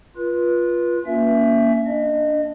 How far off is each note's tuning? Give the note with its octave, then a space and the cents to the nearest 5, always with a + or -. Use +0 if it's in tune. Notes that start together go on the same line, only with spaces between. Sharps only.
F4 +0 B4 -30
A#3 +0 C#4 +20 E5 +15
D4 +0 D#5 -30